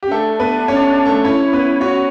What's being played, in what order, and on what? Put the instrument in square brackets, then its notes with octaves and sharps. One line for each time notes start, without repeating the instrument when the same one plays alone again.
[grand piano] G4
[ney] C#4
[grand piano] A3 A4 [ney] D4
[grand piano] B3 B4
C#4 C#5
A3 A4
[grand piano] C#4 C#5 [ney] E4
[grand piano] B3 B4
[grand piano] C#4 C#5 [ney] F#4